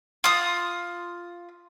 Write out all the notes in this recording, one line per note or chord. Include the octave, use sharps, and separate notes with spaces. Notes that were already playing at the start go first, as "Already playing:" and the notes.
F4 D#6